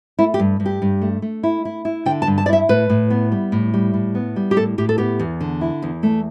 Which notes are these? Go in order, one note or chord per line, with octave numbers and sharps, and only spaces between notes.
A3 E4
G4
G2
G2
G4
G2
A3
A3
E4
E4
E4
D3 G5
A5
G2
A5
D5
E4 E5
A2 B4
A2
B3
G3
A2
G3
A2
B3
G3
G4
A2 A4
A2 G4
A4
B3 G4
E2
D3
E4
E2
A3